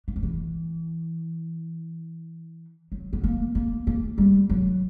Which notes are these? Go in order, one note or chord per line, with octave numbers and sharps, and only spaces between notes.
E3
F#3
E3
F#3
B3
A#3
A#3
A#3
G3
F#3